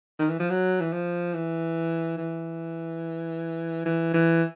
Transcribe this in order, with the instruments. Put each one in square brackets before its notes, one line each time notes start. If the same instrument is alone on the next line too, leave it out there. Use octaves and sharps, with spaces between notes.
[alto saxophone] D#3
E3
F3
F#3
E3
F3
E3
E3
E3
E3